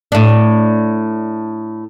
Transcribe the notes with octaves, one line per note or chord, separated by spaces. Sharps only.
A2 D4